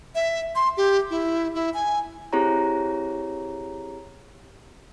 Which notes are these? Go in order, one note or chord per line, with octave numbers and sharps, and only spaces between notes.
E5
C6
G4
E4
E4
G#5
C4 E4 G4 G#4 C#5 A#5